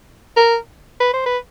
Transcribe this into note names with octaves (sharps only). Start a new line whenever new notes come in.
A#4
B4
C5
B4